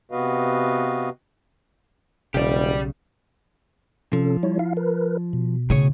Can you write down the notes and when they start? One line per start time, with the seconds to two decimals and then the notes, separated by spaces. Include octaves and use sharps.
0.11 C3 B3 F#4 B4 D#5 F5
2.34 E1 B1 C#3 G4 D5
4.13 C3 F3 C#4 A4
4.43 G3 E4 C#5
4.59 E4 F5
4.77 A#4 B4
5.33 B2
5.70 A2 C#3 G#4 C#5